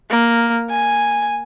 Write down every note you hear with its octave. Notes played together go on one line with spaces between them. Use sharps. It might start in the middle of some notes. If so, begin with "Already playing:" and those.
A#3
G#5